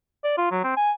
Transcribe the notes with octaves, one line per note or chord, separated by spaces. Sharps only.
D5
F4
F#3
C4
G#5